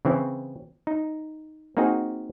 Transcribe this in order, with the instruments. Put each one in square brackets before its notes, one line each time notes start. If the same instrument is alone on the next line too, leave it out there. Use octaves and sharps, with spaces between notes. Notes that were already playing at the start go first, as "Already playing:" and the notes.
[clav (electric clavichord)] C#3 E3 C4 C#4
D#4
A#3 C4 D#4 F#4 G#4